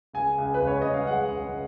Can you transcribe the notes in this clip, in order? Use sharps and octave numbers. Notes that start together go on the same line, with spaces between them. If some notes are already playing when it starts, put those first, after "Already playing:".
C#2 G#5
C#2
B4
C#2
C#5
C#2 D#5
F5
G#3 F#5
C#2